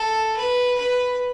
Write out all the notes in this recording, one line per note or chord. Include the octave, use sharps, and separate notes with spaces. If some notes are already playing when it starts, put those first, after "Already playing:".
Already playing: A4
B4
B4